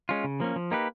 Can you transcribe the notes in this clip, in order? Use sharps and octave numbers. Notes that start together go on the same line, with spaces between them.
G#3 C#4 F4
C#3
F3 A#3 C#4
F3
A#3 D#4 G4 B4